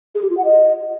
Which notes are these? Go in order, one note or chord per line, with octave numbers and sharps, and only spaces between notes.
G#4
G4
F4
F#5
D#5